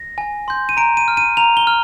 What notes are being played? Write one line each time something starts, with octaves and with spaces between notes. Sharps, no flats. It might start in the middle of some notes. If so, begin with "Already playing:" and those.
Already playing: A#6
G#5
C6 G6
D#7
A#5 D7
D#7
F6
D#7
A#5 F7
G7
F6